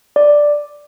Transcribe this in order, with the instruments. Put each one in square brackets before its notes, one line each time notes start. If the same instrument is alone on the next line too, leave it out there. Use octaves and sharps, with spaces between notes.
[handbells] D5